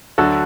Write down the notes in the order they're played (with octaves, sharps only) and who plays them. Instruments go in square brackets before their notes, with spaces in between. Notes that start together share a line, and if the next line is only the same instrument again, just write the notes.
[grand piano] D2 D3 F#3 F#4 A4